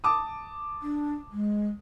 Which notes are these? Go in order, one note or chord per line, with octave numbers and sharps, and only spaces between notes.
A5 D6 D#6
D4
G#3